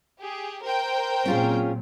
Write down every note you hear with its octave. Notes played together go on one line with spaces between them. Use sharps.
G4 G#4
A#4 C5 G5
A#2 F#3 C4 C#4 F4 G#4